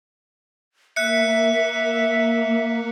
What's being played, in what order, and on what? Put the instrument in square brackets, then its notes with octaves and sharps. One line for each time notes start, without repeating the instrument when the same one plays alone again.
[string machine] A#3 [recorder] E5 [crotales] F#6 C#7